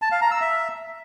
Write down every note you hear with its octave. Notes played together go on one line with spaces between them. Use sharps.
A5
F5
A#5
E6
E5